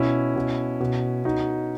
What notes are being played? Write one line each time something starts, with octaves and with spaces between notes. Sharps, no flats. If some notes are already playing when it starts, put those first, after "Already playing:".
Already playing: B2 C#4 E4
B2
B2
B2 D#4 F#4